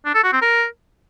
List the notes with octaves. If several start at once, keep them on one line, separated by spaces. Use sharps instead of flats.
D4
A4
F#4
C4
A#4